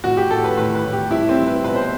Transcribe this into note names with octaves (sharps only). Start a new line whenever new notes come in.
A2 F#4
G4
A2 A4
B4
A2 B4
B4
A2
G4
G3 E4
C4
G3
B4
B2 B4
C5